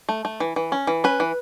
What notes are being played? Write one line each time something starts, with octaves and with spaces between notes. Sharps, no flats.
A3
A3
E3
E3
C#4
E3
C#4 B4
E3